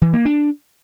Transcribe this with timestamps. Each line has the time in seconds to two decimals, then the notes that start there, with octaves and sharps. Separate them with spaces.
0.02 E3
0.13 A#3
0.25 D4